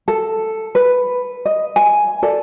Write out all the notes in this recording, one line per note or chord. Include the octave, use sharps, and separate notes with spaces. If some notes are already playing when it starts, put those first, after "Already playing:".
A4
B4
D#5
G#5
A4 D5